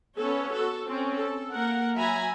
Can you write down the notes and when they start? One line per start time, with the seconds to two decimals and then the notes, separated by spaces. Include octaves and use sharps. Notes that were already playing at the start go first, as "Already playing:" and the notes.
0.17 B3 C#4 A4 C#5
0.54 F#4 A4
0.86 C4 C#4
1.15 A4
1.51 A#3 A#4 F#5
1.97 F#3 E5 G#5 A#5 B5